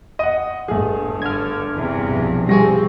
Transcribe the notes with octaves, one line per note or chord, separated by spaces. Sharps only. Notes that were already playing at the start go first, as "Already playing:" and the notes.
D#5 F#5
G1 G2 A3 G#4
D3 F6 G#6
E2 G2 C3
B1 F3
G3 C4 G4 G#4 G#5 C#6 A#6